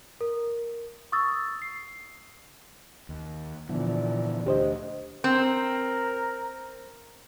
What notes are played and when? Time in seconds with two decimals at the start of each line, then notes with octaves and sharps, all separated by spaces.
0.21 A#4
1.12 C#6 D#6 E6 A6
1.62 C7
3.09 D#2
3.69 A#2 D3 E3 F3 B3
4.46 D2 D4 G4 C5 D#5
5.24 C4 A#4